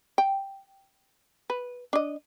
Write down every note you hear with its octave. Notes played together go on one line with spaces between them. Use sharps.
G5
B4
D4 D#5